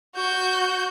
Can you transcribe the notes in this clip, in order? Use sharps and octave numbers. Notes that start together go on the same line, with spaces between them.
F#4 G6